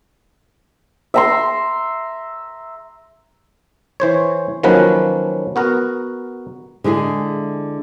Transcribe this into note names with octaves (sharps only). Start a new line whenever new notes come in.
E5 A#5 C6
E3 C5 C#5
D#3 F3 F#3 A#3 C#4 B4
B3 F#4 A#4
D3 G#3 E4 G#4